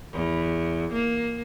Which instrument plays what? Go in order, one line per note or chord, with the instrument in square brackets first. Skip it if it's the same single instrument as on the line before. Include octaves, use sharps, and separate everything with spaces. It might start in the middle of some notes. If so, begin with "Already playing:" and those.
[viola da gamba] E2
A#3